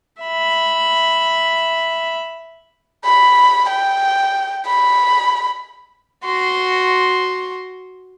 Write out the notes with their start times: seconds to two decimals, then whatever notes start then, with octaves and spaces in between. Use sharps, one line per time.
0.22 E5 B5
3.04 B5
3.69 G5
4.66 B5
6.25 F#4 C6